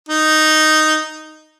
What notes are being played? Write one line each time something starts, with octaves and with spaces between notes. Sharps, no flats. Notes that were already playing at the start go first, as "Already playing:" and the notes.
D#4